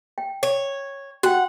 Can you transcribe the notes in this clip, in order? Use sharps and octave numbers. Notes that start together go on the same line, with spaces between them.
G5
C#5
F#4 F#5 G5